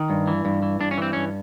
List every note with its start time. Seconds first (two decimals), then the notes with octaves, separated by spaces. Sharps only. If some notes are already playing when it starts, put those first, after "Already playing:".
Already playing: D#3
0.10 G2
0.28 E3
0.45 G2
0.63 E3
0.80 G2 D4
0.91 C#4
0.98 E3 C4
1.13 G2 C#4